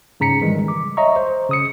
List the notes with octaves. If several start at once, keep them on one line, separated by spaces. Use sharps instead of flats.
G#2 C#3 A#5 B6 C#7
D#3 E3 G3 G#3
D6
C#5 D#5 E5 A#5 C#6
C5
C#3 D#6 C#7